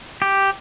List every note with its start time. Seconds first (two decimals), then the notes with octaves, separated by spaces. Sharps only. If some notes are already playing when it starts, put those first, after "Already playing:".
0.22 G4